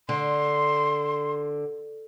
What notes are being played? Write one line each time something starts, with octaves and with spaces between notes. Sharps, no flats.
D3 C6